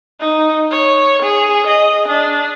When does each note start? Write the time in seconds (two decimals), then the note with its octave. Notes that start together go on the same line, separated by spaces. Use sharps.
0.20 D#4
0.71 C#5
1.23 G#4
1.67 D#5
2.08 D4